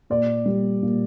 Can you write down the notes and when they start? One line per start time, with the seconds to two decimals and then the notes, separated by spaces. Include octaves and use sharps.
0.10 A#2 D5
0.46 G3
0.82 A#2